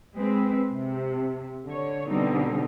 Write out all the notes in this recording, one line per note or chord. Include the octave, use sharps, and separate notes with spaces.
G#3 C4 B4
C3
D3 C#5
B2 D3 G3 C4 D#4